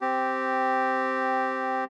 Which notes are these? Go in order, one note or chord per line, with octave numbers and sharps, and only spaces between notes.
C4 G4